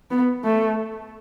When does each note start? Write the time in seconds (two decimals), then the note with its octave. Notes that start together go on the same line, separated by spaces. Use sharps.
0.11 B3
0.45 A3